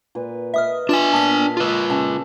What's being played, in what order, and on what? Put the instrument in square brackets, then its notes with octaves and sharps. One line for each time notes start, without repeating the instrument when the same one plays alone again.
[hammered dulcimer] A#2 B4
[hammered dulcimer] B4 D#5 [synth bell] E5 D#6 F6
[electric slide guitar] D4 G#5 [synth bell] F4 E7
[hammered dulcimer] A#2 [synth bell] A5 D#6 B6
[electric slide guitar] F4 B4
[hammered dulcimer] C#3 [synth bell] A5